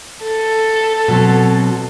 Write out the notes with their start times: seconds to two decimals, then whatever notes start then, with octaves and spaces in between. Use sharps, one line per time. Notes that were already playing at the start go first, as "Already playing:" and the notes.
0.23 A4
1.08 B2 F#3 C4